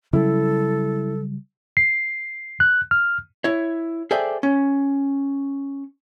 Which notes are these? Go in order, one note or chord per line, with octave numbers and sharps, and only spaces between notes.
C#3 F#3 G3 E4 A4
C7
F#6
F6
E4 C#5
G#4 A4 C5 D5 E5 G5
C#4